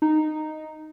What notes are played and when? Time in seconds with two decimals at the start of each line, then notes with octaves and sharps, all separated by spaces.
0.02 D#4